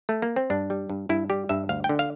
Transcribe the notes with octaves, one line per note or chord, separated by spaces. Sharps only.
A3
A#3
C4
G2 D4
G3
G2
G2 E4
G3 G4
G2 E5
D2 F5
G5
D3
F5